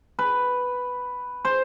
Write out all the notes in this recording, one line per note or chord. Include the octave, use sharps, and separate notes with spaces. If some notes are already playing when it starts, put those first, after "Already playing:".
B4
C5